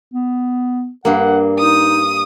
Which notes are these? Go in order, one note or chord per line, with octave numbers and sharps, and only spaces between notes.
B3
G2 A#3 F#5
D#4 D#6